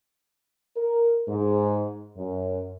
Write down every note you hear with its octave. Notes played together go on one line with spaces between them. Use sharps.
A#4
G#2
F#2